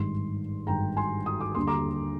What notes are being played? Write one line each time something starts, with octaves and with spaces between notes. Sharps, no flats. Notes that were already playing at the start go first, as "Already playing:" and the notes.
Already playing: G#1 G2 D#3 C6
G#1 G2 D#3 G5 A#5
G#5 C6
D#6
D6
D#2 D3 G3 D4 C6
A#5 D6